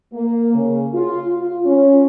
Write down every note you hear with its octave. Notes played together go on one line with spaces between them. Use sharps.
A#3
C#3
F4
F4
C#4